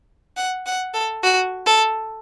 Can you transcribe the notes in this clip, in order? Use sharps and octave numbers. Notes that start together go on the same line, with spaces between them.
F#5
F#5
A4
F#4
A4